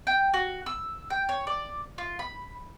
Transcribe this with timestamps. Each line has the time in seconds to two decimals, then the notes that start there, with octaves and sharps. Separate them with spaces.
0.07 G5
0.34 F#4
0.66 E6
1.10 G5
1.29 C#5
1.47 D5
1.98 F4
2.19 B5